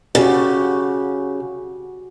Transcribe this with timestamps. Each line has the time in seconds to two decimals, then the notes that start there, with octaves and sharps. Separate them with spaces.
0.15 C#3 F#4 G4